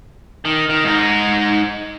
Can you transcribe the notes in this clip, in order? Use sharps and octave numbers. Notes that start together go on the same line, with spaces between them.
D#3
D#3
G#2 D#4